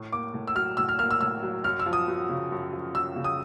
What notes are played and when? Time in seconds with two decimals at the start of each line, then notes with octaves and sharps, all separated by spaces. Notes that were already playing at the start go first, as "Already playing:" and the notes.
Already playing: A2
0.12 A#3 D6
0.34 A2
0.47 E6
0.55 F#3 F6
0.77 A2 E6
0.89 F6
0.99 A#3 F6
1.11 E6
1.21 A2 E6
1.43 F#3
1.64 F#2 F6
1.80 E6
1.86 F3
1.93 D#6
2.08 F#2
2.29 C#3
2.52 F#2
2.73 F3
2.95 F#2 E6
3.16 C#3
3.24 D#6